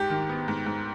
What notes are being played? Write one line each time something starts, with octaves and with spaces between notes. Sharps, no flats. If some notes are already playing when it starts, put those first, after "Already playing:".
Already playing: G#2 G4
D#3
B3
G#2
G#2